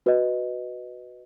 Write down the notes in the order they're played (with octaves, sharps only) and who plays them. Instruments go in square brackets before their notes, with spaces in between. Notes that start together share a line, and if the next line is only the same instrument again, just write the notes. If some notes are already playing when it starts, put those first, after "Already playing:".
[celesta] F#4 B4 D#5